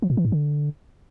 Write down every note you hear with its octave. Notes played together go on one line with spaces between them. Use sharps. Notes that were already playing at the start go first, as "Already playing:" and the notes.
F3
A#2
E3
G#2
D3